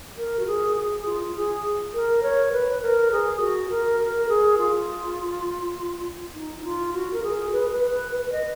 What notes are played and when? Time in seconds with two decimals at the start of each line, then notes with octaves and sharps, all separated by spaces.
0.17 A#4
0.39 F#4
0.47 G#4
0.76 G#4
1.05 F4
1.36 G#4
1.94 A#4
2.23 C#5
2.52 B4
2.82 A#4
3.11 G#4
3.40 F#4
3.70 A#4
4.00 A#4
4.29 G#4
4.58 F4
6.35 D#4
6.64 F4
6.94 F#4
7.13 A#4
7.23 G#4
7.52 B4
7.68 A#4
7.72 B4
7.91 B4
8.12 B4
8.32 D#5